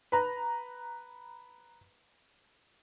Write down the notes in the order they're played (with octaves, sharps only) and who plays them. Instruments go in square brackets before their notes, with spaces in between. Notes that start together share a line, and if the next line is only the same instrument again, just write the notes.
[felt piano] B4 A#5